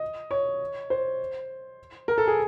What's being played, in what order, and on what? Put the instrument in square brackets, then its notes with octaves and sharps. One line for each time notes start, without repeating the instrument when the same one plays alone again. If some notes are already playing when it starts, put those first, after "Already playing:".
Already playing: [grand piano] D#5
C#5
C5
A#4
A4
G#4